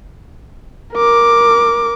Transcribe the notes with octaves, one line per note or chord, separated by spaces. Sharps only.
A#4 D6